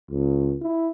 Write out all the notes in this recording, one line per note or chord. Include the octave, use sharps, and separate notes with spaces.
C#2
E4